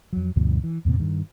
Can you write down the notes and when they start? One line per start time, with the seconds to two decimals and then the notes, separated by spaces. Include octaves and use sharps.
0.13 F2 F#3
0.36 D2 G2 B2 F3
0.64 E3
0.85 E2 A2 C3 A#3
0.99 G2 D#3